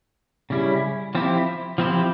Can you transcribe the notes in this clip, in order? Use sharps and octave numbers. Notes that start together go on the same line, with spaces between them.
C#3 G3 C#4 E4
F3 C4 E4 G4
F3 C4 E4 G4